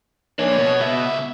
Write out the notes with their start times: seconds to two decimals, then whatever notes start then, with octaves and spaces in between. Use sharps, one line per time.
0.39 A#3 D4 C#5
0.57 B2
0.80 C#2 E5